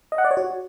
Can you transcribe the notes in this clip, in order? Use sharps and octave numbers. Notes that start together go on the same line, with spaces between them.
D#5
F#5
D5
C#5
F#4